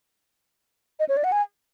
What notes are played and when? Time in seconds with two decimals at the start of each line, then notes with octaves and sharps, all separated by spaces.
0.99 D#5
1.09 C#5
1.17 D5
1.24 F#5
1.32 G#5